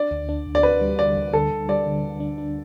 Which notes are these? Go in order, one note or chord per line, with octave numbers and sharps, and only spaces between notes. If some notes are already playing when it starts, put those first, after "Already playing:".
Already playing: D4 D5
D2
D4
D2
D5
D2 B4
G3
D3 D5
D2
D2 A4
D2
G3 D5
D3
D2
D4
D4